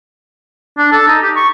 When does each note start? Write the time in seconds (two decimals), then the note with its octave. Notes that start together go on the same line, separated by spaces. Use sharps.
0.78 D4
0.93 A4
1.08 D#4
1.22 G4
1.36 C#6